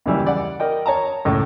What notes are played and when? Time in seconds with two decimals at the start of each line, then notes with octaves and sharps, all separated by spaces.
0.06 D#2 C#3 E3 G3
0.26 D5 F#5
0.60 A#4 D5 D#5 G5
0.86 C#5 A5 A#5
1.25 C#2 A2